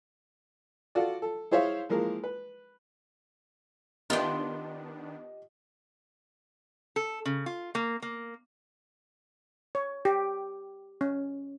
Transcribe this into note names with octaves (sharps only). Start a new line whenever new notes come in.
F4 F#4 A4 D5
A4
E4 G#4 C5 C#5 E5 F5
E3 F3 G#3 A#3 G#4 A#4
B4
D#3 B3 D4 F4 G4 D#5 G5 G7
A4
C#3
F4
A#3
A#3
C#5
G4
C#4